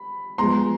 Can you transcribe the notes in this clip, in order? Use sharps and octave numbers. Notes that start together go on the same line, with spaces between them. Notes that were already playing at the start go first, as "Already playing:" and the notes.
Already playing: B5
F3 G#3 B3 A#5 C6